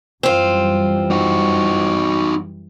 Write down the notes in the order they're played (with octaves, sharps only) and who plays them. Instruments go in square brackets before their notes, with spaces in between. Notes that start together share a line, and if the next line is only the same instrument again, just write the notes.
[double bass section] F#2 E3 G3 [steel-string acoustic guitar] C4 F4
[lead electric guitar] D#4 F#4